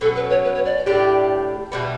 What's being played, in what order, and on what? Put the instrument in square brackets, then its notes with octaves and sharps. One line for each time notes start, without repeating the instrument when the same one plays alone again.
[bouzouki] B2 F#3 C#4 [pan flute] A4
[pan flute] B4
C#5
B4
C#5
D5
[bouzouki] A2 G3 D4 G4 [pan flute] D5
[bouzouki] B2 G3 B3 E4